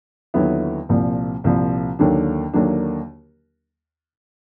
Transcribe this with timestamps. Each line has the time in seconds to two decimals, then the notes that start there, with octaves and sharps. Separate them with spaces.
0.34 D#2 D3 F#3 B3 E4
0.89 C2 A#2 F3
1.44 C2 A#2 F3
1.99 D#2 D3 F#3 A#3 D4
2.53 D#2 D3 F#3 A#3 D4